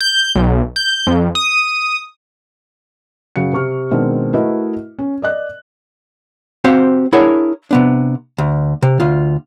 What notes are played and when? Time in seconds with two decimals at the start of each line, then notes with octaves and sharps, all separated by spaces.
0.01 G6
0.35 B1
0.76 G6
1.07 F2
1.35 D#6
3.36 F#2 C#3 F#4 C#7
3.53 C3 C#6 F6
3.91 B2 D#3 G#3 C4 D4 A#4
4.34 A3 E4 F#4 A#4 B4 D#5
4.99 C#4
5.22 D5 D#5 F#6
6.64 C4 F#4 G4 C5 F5
7.13 D4 E4 G#4 A#4 C#5 F#5
7.71 C3 B3 D4
8.38 D2
8.82 C3
9.00 D2 F4